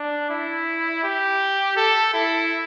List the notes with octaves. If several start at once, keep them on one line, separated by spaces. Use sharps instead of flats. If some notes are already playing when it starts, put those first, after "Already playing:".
Already playing: D4
E4
G4
A4
E4